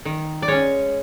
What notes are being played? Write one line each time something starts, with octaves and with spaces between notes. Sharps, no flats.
D#3
D5
G#3 C#4 C#5